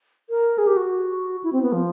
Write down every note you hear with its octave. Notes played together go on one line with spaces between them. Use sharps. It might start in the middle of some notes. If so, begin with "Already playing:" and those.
A#4
G#4
G4
F#4
E4
C4
B3
F3